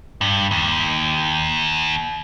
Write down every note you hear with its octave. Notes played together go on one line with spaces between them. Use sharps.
G2
D#2